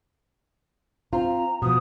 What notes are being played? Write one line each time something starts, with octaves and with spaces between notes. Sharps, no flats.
C4 F4 A#5
B2 F3 D#6